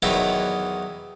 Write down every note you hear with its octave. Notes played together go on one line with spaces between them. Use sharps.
E2 D#3 F#3 D#4 E4